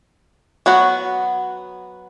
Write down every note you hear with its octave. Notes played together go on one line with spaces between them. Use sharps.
F#3 B3 F#4